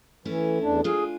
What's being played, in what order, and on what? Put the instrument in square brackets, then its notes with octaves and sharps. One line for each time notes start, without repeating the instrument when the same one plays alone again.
[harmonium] E3 [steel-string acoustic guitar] A3 C#4 E4
[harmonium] E2 D4
[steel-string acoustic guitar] D4 F4 G#5 [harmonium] G#4